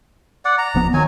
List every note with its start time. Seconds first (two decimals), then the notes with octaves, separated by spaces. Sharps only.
0.45 D5 F#5
0.58 A#5
0.75 D1 F3 B3
0.94 D#3 F#3 G#5